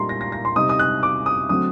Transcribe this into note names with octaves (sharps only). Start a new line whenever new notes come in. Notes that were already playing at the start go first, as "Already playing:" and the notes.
Already playing: A#2 G3 A#3 D#4 A#5 C6
A#6
A#6
A#6
C6
C3 G3 C4 D#4 D#6
D#6
F#6
D6
D#6
D3 F#3 A3 C4 D#6